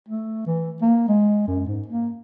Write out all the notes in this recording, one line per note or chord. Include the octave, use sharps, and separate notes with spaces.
A3
E3
A#3
G#3
F#2
G#2
A#3